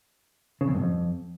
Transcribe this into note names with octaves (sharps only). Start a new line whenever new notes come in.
C#3
E2
G2
F2